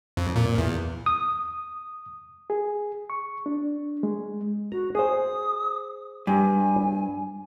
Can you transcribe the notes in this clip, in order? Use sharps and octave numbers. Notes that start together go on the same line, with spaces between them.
F2
A#2
E2
D#6
G#4
C#6
D4
G#3
F#4 A#5
G#4 C5 D#6
G2 G#5